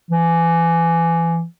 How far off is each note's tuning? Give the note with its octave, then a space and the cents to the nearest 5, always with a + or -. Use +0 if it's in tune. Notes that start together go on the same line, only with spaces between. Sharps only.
E3 +25